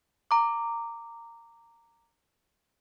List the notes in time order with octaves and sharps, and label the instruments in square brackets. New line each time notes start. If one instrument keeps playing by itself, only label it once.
[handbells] A#5 D6